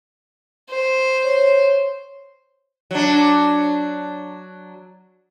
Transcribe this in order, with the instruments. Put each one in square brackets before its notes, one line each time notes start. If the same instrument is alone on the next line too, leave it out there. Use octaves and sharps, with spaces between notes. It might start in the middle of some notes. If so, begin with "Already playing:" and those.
[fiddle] C5
[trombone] C#5
[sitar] F#3 D4